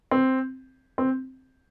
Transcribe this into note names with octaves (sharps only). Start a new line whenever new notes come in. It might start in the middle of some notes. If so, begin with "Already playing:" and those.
C4
C4